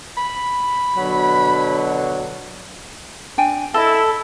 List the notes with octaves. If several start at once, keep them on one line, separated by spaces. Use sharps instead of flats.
B5
B2 D3 F#3
D4 G5 G#5
E4 A4 D#5 A5